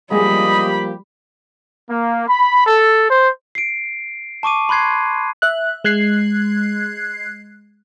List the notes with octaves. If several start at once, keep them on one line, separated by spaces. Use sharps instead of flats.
F3 G3 G#3 A#3 G4 G#4 D#5 B5
A#3
B5
A4
C5
C7 D7
A5 C#6 D6 D#7
B5 C6 F#6 G#6 C7
E5 F#6
G#3 F#6 G#6 C7